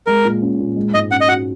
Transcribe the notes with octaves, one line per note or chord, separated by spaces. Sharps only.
G#3 A#4
A#2
C#4
A#2
G#3
G#2 D#5
C#4 F#5
D#5
F#4 F#5